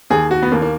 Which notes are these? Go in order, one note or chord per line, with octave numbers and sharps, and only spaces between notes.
D#2 G#4
F#4
B3
D#2 A#3
A#3